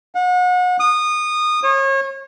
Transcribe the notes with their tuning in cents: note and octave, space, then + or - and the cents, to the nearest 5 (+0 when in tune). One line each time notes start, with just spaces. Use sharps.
F#5 -35
D#6 -20
C#5 -35